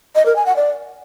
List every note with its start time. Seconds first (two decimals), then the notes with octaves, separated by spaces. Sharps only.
0.15 D#5
0.26 A#4
0.36 G#5
0.46 F#5
0.56 D5